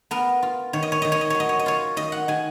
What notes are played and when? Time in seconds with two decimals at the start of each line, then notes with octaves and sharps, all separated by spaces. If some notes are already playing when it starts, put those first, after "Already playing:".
0.11 B3 A#4
0.43 F4
0.73 D#3 C#5
0.83 D#5
0.92 C#5
1.02 D#3 D#5
1.12 C#5
1.21 D#5
1.30 F#3 C#5
1.40 D#5
1.49 C#5
1.59 D#5
1.66 F4 C#5
1.96 D#3 D#5
2.12 F#5
2.28 D#3 G#5